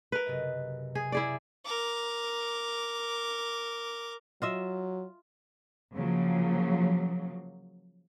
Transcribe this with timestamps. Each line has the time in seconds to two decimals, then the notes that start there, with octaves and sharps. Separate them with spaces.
0.12 A#4 B4
0.26 F#1 C3 D#5
0.95 G#4
1.12 E4 G#4 D5
1.65 A#4 D6
4.42 F#3 F4 D#5 E5
5.96 C#3 F3 F#3 A#3